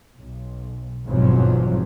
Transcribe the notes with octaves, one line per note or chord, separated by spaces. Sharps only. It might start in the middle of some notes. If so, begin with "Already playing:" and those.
B1
G#1 E2 G2 B2 F3 F#3